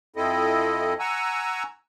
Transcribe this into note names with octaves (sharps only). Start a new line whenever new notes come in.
F2 F3 C4 E4 A4 D#5
F#5 G#5 A#5 C#6 E6